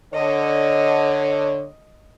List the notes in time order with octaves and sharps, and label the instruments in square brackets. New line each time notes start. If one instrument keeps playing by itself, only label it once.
[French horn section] D3 C#5 [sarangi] D#5